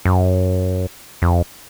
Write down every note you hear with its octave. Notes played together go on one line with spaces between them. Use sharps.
F#2
F2